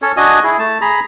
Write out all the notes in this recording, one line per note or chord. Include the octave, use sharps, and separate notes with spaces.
C#4 A4 C#5
D4 F#4 D#5 G#5
E4 G#4
A3 A5
G#4 A#5 B5